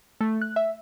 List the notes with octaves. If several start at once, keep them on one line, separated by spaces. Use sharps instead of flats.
A3
F#6
E5